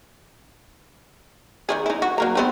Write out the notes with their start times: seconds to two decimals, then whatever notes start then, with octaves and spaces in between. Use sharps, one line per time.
1.69 D#3 F#3 G#4
1.86 D#4 E4
2.02 F#4
2.18 F#3 A#3 A#5
2.35 B3 C4 D#4